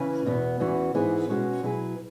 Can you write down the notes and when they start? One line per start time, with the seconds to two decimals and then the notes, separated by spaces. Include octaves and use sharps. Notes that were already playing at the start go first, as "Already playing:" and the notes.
Already playing: C#3 E3 C#4 E4 B4
0.26 E2 B2 B3
0.60 E2 E3 C#4 F#4
0.94 G#2 E3 B3 E4 G#4
1.29 B2 G#3 C#4 F#4 C#5
1.63 B2 F#3 E4 G#4 B4